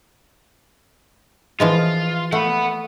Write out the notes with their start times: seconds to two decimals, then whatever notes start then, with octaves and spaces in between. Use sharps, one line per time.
1.60 E3 F3 G#3 F4
2.32 A3 F#5 B5